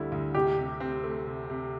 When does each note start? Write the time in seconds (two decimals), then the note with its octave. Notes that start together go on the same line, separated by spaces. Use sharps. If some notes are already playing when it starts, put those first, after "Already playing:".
Already playing: D2 D3 G3 E4
0.12 D2
0.35 C3 G4
0.58 C3
0.80 C4
1.03 A3
1.27 C3
1.50 C3